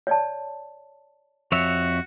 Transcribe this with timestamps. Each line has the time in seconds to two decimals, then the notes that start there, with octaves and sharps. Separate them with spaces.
0.07 C#5 D5 A5
1.52 F2 F#4 C#5 E5